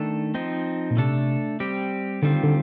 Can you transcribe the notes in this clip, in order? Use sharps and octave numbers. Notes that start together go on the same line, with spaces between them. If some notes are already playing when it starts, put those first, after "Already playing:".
Already playing: D#3 A3 D4 A4
F3 C4 D#4
A#2
C3 A3 D4 A4
G3 C4 G4
D3 D#3 G3 C4 F4
D3